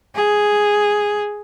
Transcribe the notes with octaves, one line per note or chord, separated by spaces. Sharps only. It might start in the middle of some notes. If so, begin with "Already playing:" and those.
G#4